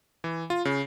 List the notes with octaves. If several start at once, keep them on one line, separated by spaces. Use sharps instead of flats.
E3
F4
C#3